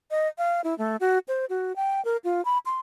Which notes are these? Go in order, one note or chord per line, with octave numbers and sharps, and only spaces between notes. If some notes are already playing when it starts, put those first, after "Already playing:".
D#5
F5
E4
A3
F#4
C5
F#4
G5
A#4
F4
B5
C6